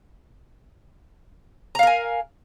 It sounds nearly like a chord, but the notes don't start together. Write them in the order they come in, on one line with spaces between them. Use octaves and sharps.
A#5 F5 A#4 G#5